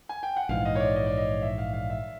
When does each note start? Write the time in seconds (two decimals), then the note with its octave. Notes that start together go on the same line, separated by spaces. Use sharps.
0.09 G#5
0.23 G5
0.36 F#5
0.49 A#1 G#2 E3 F5
0.65 D#5
0.75 C#5
0.80 D5
0.96 D#5
1.06 D5
1.17 D#5
1.42 E5
1.58 F5
1.73 F5
1.90 E5